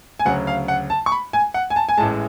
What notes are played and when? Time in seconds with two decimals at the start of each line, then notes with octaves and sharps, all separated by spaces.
0.19 G#5
0.25 D2 C#3 F#3 F#5
0.47 F5
0.68 F#5
0.90 A5
1.06 C#6
1.12 B5
1.33 G#5
1.54 F#5
1.70 G#5
1.76 A5
1.89 G#5
1.98 A1 A2 G#3 A5